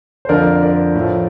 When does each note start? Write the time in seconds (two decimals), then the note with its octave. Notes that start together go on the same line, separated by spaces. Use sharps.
0.25 C5
0.29 F2 D3 F3 A#4 D5
0.63 A#4 D5
0.95 A2 F3